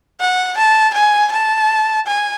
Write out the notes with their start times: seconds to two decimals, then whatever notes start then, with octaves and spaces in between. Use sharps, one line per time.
0.20 F#5
0.57 A5
0.94 G#5
1.32 A5
2.07 G#5